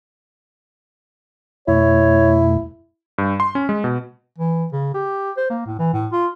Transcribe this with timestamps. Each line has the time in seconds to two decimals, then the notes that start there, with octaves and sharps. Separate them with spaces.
1.68 F2 B2 A3 E4 C#5
3.18 G2
3.40 C6
3.55 C#4
3.69 G#3
3.84 B2
4.38 E3
4.73 C#3
4.94 G4
5.37 C5
5.50 A#3
5.66 A2
5.79 E3
5.93 A2
6.12 F4